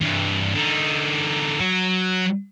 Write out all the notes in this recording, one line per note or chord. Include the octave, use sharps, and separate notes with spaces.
G2 E3
D3 D#4
F#3